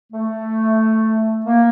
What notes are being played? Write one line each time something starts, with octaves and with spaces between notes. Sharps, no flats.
A3
A#3